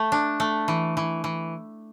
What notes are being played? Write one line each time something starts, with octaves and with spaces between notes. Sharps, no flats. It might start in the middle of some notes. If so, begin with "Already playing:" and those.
Already playing: A3
D4
A3
E3
E3
E3